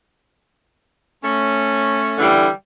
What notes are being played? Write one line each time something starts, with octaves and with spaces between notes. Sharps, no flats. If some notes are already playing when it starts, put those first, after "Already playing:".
A3 C#4
D3 E3 G3